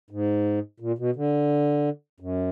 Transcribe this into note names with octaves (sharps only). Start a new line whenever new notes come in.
G#2
A#2
B2
D3
F#2